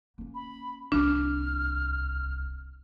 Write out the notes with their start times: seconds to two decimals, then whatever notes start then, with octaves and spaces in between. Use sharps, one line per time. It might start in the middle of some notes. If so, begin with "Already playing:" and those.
0.18 A#3 C#4
0.35 B5
0.92 D1 C2 D4 F6